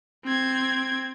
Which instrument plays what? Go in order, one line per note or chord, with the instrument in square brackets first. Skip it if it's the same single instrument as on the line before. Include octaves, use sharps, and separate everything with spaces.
[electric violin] C4 G#6